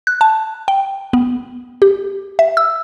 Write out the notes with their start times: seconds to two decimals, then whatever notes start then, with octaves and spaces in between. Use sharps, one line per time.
0.07 F#6
0.21 A5
0.68 G5
1.13 B3
1.82 G4
2.39 E5
2.57 E6